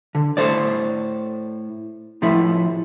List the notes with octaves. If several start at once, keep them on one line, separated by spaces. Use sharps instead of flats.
D3
A2 A4 C5 D5
A2 F3 A3 E4